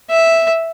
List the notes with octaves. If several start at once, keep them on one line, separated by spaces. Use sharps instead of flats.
E5